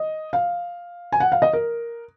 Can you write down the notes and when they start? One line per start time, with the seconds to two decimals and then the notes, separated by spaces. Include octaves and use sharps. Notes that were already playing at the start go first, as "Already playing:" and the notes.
Already playing: D#5
0.33 F5
1.12 G#5
1.20 F#5
1.32 F5
1.42 D#5
1.53 A#4